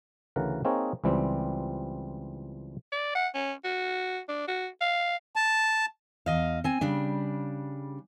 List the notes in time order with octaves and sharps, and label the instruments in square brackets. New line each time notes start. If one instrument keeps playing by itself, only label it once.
[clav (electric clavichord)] D2 C#3 E3 A#4 F#5
A#3 C4 D#4 G#4 A#4 C#5
C#2 E3 G3 C4
[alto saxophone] D5
F#5
C#4
F#4
D4
F#4
F5
[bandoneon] A5
[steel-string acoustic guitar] E2 D#5 F5
C4 G#5
C#3 G3 D4